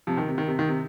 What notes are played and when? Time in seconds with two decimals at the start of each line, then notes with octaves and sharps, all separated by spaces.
0.07 C3 F3
0.17 D#3
0.28 C3
0.38 D#3
0.48 C3
0.59 D#3
0.68 C3